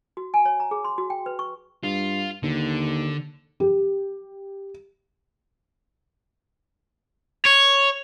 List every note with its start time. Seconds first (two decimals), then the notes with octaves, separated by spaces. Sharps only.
0.17 F#4
0.34 G#5
0.46 C#5
0.60 A#5
0.71 G#4
0.84 C6
0.98 F#4
1.10 G5
1.26 B4
1.39 C#6
1.83 G2 F4
2.43 D#2 D3
3.60 G4
7.45 C#5